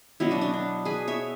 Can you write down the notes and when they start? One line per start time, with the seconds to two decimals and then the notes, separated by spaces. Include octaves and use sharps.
0.20 B2 F#3 B3 C#4 E4
0.31 D4 F#4
0.41 D4
0.53 D4
0.85 G#4 B4
1.08 C#5 E5